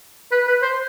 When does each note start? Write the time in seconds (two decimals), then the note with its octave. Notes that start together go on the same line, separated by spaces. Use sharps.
0.32 B4
0.47 B4
0.62 C5